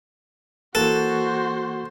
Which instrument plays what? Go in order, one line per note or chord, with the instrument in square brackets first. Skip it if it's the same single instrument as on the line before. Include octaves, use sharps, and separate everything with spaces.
[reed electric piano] E3 A#3 F#6 [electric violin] F#4 C5 [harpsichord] A4